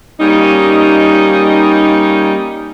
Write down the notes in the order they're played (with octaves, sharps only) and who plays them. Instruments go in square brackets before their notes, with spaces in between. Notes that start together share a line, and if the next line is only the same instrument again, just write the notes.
[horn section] G3 A#3 C#4 D#4